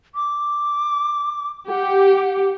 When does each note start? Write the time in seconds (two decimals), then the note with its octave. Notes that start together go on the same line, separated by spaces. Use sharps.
0.15 D6
1.69 G4 F#5